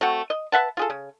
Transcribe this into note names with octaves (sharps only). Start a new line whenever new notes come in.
A3 C4 F#4
D#5
B4 E5 F#5 A5
F4 G#4 A4
C#3